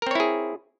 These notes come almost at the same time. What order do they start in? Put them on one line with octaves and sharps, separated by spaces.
A#4 C4 C#5 E4 G#4